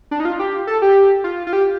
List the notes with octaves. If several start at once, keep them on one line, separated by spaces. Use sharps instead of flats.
D4
D#4
F4
G4
A4
G4
F4
F4
G4